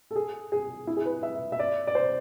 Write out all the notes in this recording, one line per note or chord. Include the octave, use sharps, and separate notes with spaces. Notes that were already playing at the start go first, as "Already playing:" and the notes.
A4
G#4
G#4
E4
G#4
B4
E5
E5
D5
D5
C5